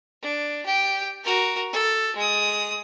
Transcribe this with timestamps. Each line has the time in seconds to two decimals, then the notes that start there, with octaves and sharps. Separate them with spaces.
0.22 D4
0.66 G4 G5
1.24 F#4 A#4
1.73 A4
2.16 G#3 D#6